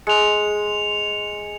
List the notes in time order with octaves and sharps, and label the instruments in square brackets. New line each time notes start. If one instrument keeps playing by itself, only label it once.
[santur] G#3 [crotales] C#7 F7